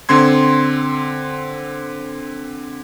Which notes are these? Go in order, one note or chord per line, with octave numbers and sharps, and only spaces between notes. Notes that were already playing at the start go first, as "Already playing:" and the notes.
D3 C4 C6 G#6